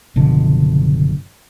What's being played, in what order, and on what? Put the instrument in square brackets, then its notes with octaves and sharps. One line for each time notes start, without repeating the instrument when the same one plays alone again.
[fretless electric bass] F#1 B2 D3 F3